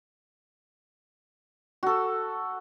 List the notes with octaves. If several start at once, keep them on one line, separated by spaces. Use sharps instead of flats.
F#4 A4